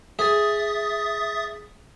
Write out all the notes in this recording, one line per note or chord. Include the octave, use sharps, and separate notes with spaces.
G#4 E5 D#6 A6